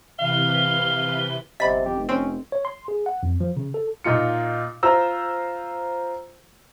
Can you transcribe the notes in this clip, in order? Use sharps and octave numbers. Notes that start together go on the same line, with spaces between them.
C3 E3 B4 F5 G7
G1 C3 D#5 B5 B6
F2 G4
F1
C4 C#4
C#5
C6
G#4
F#5
F2
F3
C#3
A4
A#2 D#4 F4 C#7
F4 C5 A#5 E6